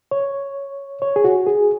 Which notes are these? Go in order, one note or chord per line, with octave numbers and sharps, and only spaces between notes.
C#5
C#5
G#4
F#4
G#4